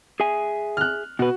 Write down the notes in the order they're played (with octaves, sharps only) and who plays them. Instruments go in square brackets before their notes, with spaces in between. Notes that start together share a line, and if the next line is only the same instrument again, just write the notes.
[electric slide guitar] G#4 E5 G#5
[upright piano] F6 F#6
[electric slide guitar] B2 B4 [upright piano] F#4